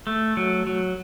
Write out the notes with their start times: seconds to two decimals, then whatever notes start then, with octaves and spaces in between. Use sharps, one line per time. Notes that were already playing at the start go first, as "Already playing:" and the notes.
0.07 A3
0.37 F#3
0.67 F#3